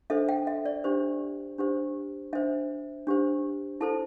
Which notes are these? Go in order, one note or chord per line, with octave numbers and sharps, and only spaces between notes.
D4 A4 C5 E5
G5
E5
D5
D4 G4 C5
D4 G4 C5
D4 C5 E5
D4 G4 C5
E4 A4 C5 A5